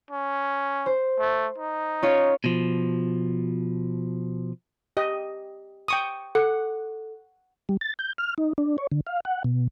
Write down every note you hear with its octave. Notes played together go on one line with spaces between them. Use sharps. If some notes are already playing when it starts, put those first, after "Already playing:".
C#4
C5
A3
D#4
C#4 F4 C#5
B2 F3
G4 D#5
G5 C#6 D#6
A4 F#5
G3
A6
G6
F6
D#4
D4
C#5
D3
F5
F#5
B2